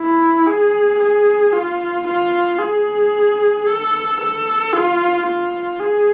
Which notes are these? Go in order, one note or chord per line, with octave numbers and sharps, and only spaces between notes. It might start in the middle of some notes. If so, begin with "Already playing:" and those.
Already playing: E4
G#4
G#4
F4
F4
G#4
A4
A4
F4
F4
G#4